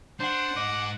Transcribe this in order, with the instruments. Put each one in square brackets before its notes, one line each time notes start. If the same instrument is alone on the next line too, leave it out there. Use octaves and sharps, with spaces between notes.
[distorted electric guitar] D4 [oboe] C5 [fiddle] F#5
[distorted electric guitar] G#2 D#5 [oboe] D6